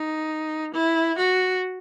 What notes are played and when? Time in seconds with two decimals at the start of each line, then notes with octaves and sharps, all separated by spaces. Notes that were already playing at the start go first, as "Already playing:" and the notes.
Already playing: D#4
0.74 E4
1.18 F#4